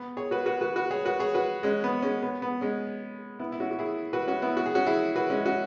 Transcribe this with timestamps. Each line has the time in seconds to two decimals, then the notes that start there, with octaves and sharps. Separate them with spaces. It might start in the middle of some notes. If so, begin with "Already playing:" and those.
Already playing: B3
0.17 G#4 C#5
0.31 F#4 B4
0.46 F#4 B4
0.61 F#4 B4
0.76 F#4 B4
0.91 G#4 C#5
1.05 F#4 B4
1.20 G#4 C#5
1.34 F#4 B4
1.63 G#3 C#4
1.84 B3
2.02 G#3 C#4
2.22 B3
2.42 B3
2.61 G#3 C#4
3.39 B3 E4
3.52 E4
3.60 C#4 F#4
3.71 F#4
3.79 E4 G#4
4.13 F#4 B4
4.28 C#4 F#4
4.42 B3 E4
4.57 F#4
4.66 G#4
4.75 C#4 F#4
4.86 E4 G#4
5.16 F#4 B4
5.30 G#3 C#4
5.45 C#4 F#4